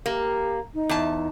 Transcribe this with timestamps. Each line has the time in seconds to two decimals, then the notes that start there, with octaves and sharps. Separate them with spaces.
0.06 A#3 G4
0.74 D#4
0.89 E2 A5